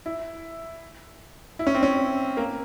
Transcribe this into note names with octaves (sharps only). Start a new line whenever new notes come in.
E4
E4
C#4
C4
C#4
A#3